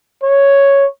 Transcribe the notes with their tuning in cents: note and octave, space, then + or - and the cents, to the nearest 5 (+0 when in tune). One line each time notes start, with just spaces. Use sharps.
C#5 +0